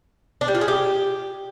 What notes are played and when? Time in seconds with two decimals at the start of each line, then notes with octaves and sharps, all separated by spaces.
0.41 D4
0.48 G3
0.55 F4
0.61 G#4
0.68 G4